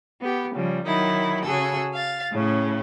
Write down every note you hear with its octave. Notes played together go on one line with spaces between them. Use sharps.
B3 G4
C#3 F3 G3
D#3 F#3 D#4 E4
C#3 F#4 G#4 A4 E6
F5 A6
A2 C#3 C#4